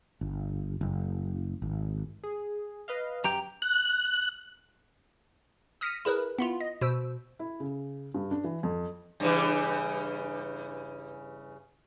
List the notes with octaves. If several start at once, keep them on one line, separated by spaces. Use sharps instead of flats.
G1
F#1
G#1
G#4
B4 D#5 F5
F#2 G4 G5 A#5
F#6
D#6 F6 A#6 B6 C#7 D#7
E4 G#4 A#4 B4
B3 E4 F4
D#5
B2 C5 E6
E4
C#3
G2
D4
E3
F2
G2 C#3 E3